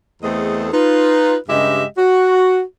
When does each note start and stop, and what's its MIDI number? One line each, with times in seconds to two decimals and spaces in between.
0.23 0.67 40
0.23 0.67 57
0.23 0.67 60
0.23 0.67 68
0.23 0.67 69
0.23 0.67 75
0.72 1.35 63
0.72 1.35 65
0.72 1.35 71
1.48 1.83 43
1.48 1.83 49
1.48 1.83 56
1.48 1.83 67
1.48 1.83 75
1.48 1.83 76
1.97 2.61 66